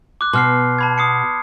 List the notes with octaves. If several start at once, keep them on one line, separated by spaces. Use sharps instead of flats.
D6 F#6
B2 C6 F6 C7
A5 B5 G#6
D#6 C7 C#7